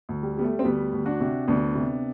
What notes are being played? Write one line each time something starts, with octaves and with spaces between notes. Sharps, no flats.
D2
G3
G3 B3
A3
C4
D2 G3 B3
D2
D4 F#4
C3
D2 B3 D4
C3